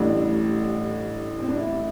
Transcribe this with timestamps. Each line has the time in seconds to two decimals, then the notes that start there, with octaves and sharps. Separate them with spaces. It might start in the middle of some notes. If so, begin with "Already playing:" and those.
Already playing: A1 A2 G3 D4
1.40 C4
1.48 D4
1.57 E4